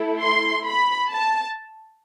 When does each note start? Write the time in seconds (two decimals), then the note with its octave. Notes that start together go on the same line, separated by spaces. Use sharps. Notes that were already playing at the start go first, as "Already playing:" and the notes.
Already playing: A3 E4 A4
0.22 C6
0.66 B5
1.10 A5